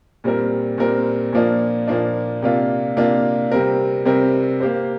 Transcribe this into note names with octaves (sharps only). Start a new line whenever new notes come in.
A#2 G3 C4 A#4
A#2 G3 C4 A#4
A#2 F3 A#3 D4
A#2 F3 A#3 D4
C3 A#3 D4 F4
C3 A#3 D4 F4
C3 G3 C4 A#4
C3 G3 C4 A#4
A#3 G4 C5